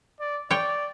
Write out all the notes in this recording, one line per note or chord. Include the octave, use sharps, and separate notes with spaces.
D5
C#5 D5 G5